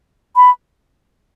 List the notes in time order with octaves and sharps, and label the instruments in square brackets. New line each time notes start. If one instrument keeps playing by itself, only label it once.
[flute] B5